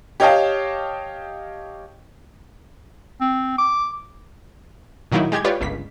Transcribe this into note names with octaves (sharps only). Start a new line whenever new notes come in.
G4 C#5 D#5 F5 G5 A5
C4
D6
A#2 D#3 F#3 A#3 D#4 E4
G#3 G4 G#6
F4 G4 B4 C#5 D5
G1 C#2 B6